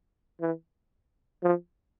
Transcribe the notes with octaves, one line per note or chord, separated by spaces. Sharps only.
E3
F3